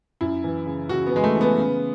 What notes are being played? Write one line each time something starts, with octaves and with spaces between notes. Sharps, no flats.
F#2 E4
E3
C#3
C#3 F#4
B3
E3 G#3
A3
E3
B3
C#3